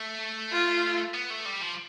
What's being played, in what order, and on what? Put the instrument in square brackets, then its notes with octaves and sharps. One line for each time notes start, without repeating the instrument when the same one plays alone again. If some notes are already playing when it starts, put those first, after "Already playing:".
Already playing: [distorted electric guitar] A3
[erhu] F4
[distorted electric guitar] B3
A3
G3
F3